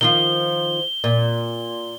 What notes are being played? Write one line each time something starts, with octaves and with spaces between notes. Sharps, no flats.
D#3 F3 F4 G7
A#2